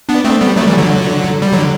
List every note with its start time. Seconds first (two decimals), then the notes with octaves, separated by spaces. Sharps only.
0.09 B3 D4
0.25 A3 C4
0.41 G3 B3
0.56 F#3 A3
0.67 E3 G3
0.78 D3 F#3
1.42 G3
1.52 D3 F#3